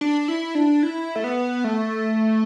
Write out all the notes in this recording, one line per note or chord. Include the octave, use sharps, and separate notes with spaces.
D4
E4
D4
E4
A3
B3
A3